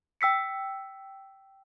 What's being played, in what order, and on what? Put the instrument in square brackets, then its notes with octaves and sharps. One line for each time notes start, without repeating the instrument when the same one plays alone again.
[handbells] G5 E6 B6 C#7